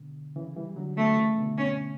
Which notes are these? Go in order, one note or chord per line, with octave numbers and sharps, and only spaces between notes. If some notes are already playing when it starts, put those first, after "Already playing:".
Already playing: B2 D3
C#3 E3
E3 G3
D3 F#3
D3 F#3 A3
C#3 E3
B2 D3
C#4